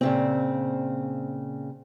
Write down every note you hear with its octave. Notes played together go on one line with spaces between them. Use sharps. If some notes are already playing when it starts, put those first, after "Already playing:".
A#2 C#3 C4